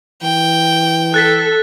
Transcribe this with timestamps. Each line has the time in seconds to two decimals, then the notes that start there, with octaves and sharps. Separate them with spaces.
0.23 E3 G5
1.14 A4 F#6 A6 B6